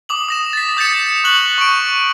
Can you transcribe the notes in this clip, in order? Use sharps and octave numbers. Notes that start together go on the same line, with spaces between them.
D6 D#6 F#7
D#6 A#6 E7
A6 B6
D#6 G6 A6 B6 C#7 E7
C#6 F#6 F#7 G7
C#6 D7